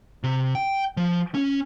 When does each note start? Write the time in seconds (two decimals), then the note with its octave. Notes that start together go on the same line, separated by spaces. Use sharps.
0.24 C3
0.55 G5
0.97 F3
1.35 C#4